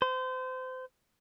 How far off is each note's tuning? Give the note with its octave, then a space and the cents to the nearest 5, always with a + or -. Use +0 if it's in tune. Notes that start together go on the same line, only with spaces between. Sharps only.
C5 -30